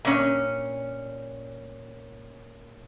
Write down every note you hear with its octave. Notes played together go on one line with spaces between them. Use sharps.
A#2 C#4